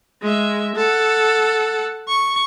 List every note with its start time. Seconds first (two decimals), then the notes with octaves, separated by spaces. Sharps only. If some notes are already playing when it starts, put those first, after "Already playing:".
0.22 G#3 E5
0.76 A4 F#5
2.08 C#6